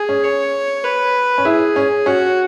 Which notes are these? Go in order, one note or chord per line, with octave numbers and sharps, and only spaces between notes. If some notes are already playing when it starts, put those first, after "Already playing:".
Already playing: G#4
C#4
C#5
B4
C#4
E4 G#4
C#4
C#4 F#4